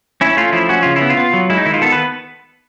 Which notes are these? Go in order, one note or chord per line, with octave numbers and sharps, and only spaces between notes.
C#4 E4
A3 F4
F3 E4
C#4 F#4
C#3 F4
E4
B3
F4
B3
F#3
G#3 E4
D#4
D#3 E4
F4
B3 A4
B4